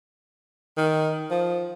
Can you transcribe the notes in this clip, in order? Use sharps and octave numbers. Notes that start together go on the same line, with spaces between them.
D#3
F3